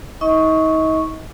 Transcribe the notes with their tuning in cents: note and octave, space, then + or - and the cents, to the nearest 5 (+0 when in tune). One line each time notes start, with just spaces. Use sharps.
D#4 +35 D#5 +35 C#6 +0